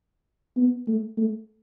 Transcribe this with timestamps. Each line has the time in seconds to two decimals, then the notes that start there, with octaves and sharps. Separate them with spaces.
0.56 B3
0.87 A3
1.18 A3